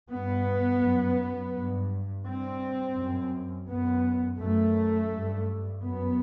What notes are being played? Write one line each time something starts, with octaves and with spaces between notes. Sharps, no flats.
G2 B3
F#2
G2
G2 C4
F#2
F#2 B3
F#2 A3
G2
F#2 B3